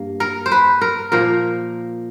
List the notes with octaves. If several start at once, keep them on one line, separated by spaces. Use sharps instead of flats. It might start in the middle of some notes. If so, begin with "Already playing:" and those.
Already playing: G2 A#3
A#4
C5
B4
A#4
A#2 F3 A#3 A#4